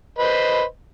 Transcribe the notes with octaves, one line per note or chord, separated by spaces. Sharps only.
B4 C5 D#5